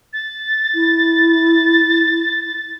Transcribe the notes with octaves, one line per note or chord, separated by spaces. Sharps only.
A6
E4